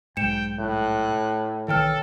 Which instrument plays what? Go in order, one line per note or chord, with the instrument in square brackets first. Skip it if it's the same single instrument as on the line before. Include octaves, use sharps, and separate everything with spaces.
[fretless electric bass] B1 G#2 [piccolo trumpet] G5 [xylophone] C#7 E7
[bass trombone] A2 [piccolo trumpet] F#6
[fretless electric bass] B1 D#3 E3 [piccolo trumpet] A4 [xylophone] C#5 G5 F6